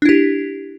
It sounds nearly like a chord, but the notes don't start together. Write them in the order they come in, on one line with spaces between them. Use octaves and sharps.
D4 E4 G4